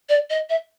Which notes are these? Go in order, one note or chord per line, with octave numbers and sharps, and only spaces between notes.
D5
D#5
E5